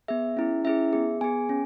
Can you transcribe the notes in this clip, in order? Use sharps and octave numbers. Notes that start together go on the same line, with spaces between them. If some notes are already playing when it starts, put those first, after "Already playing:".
B3 G#4 E5
C#4 E4 G#4
C#4 E4 G#4 E5
B3 G#4
B3 G#4 G#5
C#4